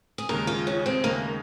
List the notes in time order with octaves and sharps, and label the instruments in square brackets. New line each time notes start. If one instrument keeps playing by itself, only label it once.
[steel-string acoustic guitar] G#4
[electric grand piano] D#2 C#3 G#3 D#4 [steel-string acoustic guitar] A#4
[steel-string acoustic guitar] F4
C#4
C4
[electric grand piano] D#2 C#3 G#3 D#4 [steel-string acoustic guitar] A#3